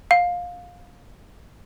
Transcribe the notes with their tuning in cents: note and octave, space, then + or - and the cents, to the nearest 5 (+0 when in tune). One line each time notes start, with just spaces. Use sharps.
F5 +20